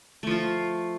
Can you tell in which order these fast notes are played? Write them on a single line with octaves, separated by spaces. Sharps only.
A3 F3 F4